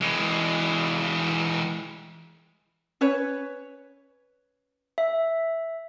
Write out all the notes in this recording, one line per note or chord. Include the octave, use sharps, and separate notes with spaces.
E3 G#3
C#4 B4 C#5
E5